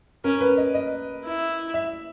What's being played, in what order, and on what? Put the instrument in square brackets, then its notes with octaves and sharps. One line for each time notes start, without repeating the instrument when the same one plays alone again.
[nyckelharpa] C#4 [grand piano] A#4
[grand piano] B4
D#5
D#5
[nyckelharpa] E4
[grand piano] E5